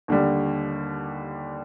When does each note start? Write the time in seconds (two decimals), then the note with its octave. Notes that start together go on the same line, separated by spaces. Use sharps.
0.08 D#2 D3 G3